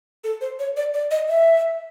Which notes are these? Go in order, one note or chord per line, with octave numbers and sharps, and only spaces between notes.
A4
C5
C#5
D5
D5
D#5
E5